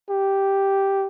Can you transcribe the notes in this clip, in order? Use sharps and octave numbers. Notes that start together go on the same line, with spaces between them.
G4